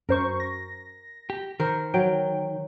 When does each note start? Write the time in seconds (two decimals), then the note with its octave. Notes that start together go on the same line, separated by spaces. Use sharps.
0.09 F#2 A#4 C5 C#6
0.40 A#6
1.30 G4
1.60 D#3 A#4 C5
1.94 F#3 G5